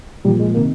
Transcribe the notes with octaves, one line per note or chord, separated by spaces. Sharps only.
A#2 F3 G3
G#3
C3 D#3 A#3